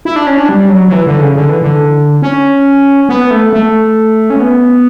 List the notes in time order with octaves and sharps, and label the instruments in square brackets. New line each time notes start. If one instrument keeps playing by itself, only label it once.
[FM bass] E4
D4
C#4
D4
G3
F#3
F#3
E3
D3
C#3
D3
E3
D3
C#4
B3
A3
A3
C#4
B3